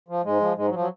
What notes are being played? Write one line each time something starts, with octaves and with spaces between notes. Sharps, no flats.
F3
G#2 G#3
F3
G#2 G#3
F#3
F3
F#3